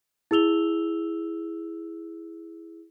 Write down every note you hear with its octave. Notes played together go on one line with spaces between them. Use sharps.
E4 G#4 E6 F7 G7